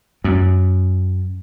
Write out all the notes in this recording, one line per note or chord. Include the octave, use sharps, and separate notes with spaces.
F#2